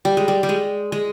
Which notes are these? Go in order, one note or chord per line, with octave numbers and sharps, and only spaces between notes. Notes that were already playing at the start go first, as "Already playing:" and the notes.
G3
G#3
G3
G3
G#3
G#3